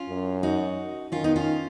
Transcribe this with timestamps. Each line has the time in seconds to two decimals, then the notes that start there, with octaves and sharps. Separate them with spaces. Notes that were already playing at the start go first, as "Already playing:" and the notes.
Already playing: C#4 F4
0.09 F#2
0.43 D#4 F#4
1.12 D#3 C#4 F4
1.24 B3 D#4
1.36 C#4 F4